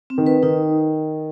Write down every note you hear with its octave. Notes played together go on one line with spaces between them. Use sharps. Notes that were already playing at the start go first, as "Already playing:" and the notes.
C4
D#3
B4
D#3 D#4